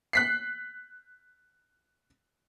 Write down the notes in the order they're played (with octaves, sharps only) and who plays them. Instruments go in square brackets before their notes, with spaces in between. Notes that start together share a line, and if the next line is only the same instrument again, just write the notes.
[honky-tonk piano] F#6 B6 C7